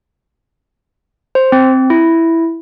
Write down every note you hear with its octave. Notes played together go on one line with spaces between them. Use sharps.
C5
C4
E4